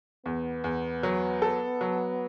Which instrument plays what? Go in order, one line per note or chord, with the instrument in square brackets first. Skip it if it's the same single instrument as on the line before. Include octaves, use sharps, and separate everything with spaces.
[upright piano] E2 [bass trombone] B3
[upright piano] E2
F#3
A4
F#3